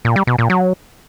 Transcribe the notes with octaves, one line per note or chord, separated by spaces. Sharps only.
A#2
G3
B2
A#2
F#3